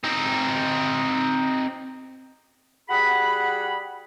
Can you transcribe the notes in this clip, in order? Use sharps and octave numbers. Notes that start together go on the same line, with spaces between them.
C4 D#4
G3 F#4 G#4 F#5 B5